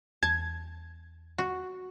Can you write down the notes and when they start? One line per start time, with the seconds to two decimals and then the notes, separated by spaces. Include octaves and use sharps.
0.23 E2 A5 G#6
1.38 F#4